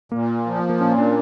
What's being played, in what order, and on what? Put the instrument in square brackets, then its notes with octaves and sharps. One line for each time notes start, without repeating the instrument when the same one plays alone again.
[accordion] A#2 [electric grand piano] A#3
[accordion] F3
[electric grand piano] A#3
[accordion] A#2 [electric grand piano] C#4
[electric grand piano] D4